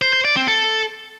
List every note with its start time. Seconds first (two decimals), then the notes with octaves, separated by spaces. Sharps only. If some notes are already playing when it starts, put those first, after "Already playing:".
0.02 C5
0.13 C5
0.25 D5
0.36 C4
0.48 A4